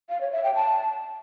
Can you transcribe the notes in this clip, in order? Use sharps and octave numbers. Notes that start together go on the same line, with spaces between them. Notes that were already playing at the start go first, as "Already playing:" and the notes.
F5
C#5
E5
G5
A5